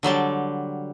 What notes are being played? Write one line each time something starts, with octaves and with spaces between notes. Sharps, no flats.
D3 F#3 G3 A5